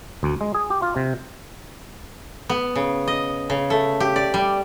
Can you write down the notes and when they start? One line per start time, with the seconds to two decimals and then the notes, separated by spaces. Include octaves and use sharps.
0.23 D2
0.41 G#3
0.54 G#4
0.70 G4
0.82 F4
0.96 C3
2.50 B3
2.76 C#3
3.08 D#5
3.50 C#3
3.70 A3
4.00 G4
4.16 D5
4.34 G3